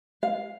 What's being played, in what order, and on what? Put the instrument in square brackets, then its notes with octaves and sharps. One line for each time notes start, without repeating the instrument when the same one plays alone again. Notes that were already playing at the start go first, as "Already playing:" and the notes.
[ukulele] F5